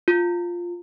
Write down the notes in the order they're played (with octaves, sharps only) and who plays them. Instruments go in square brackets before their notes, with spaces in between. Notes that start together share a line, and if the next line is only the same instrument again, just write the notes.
[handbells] F4